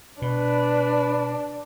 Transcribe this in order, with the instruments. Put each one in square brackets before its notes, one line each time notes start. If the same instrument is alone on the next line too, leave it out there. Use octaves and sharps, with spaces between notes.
[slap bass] B2 [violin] D4 [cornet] B4